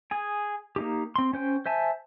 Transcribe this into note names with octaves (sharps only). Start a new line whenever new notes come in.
G#4 G#5
A#3 D#4 G4
C4 C6
C#4 C5 G5
C5 E5 G#5 A5